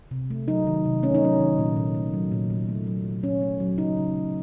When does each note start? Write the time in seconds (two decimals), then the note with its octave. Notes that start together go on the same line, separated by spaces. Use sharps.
0.11 C3
0.30 A3
0.48 F#3 D#4
0.67 D#3
0.86 C3
1.03 A3 C#4
1.15 D#4
1.21 F#3 C#4
1.40 D#3
1.58 A#2
1.76 A#2
1.95 A3
2.14 F#3
2.32 A#2
2.50 A#2
2.68 A3
2.87 F#3
3.05 A#2
3.23 A#2 C#4
3.41 A3
3.60 F#3
3.78 C#3 D#4
3.97 C#3
4.15 A3